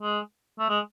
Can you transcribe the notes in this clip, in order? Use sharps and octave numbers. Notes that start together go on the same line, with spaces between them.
G#3
A3
G#3